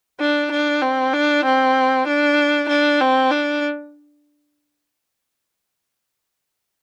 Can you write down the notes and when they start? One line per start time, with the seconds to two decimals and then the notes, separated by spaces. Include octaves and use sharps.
0.20 D4
0.52 D4
0.82 C4
1.13 D4
1.45 C4
2.07 D4
2.69 D4
3.01 C4
3.31 D4